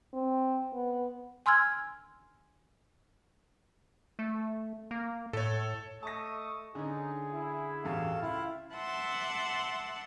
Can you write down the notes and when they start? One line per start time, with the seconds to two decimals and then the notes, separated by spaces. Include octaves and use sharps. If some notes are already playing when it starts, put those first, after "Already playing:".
0.14 C4
0.74 B3
1.46 G#5 C6 E6 F6 G#6
4.19 A3
4.91 A#3
5.33 A2 A4 C#5
6.03 A3 D#5 A5 C#6 D#6 A#6
6.75 D3 C#4 D#4 G#4
7.31 E4
7.84 A1 E2 G2 F#4 A4 F5
8.22 C#2 E4 F4 F5
8.73 E5 F#5 A5 C6 D6 E6